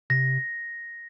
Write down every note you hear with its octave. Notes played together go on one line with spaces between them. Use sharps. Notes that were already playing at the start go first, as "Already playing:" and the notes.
C3 A#6